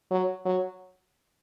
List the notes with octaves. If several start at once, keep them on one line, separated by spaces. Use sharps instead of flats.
F#3
F#3